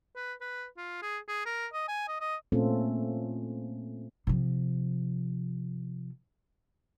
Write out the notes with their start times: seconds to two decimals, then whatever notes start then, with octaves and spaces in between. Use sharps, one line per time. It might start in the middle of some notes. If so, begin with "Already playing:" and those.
0.16 B4
0.41 B4
0.77 F4
1.02 G#4
1.28 G#4
1.46 A#4
1.73 D#5
1.88 G#5
2.08 D#5
2.20 D#5
2.52 A#2 A3 C4 C#4 F4 A4
4.27 C3 F3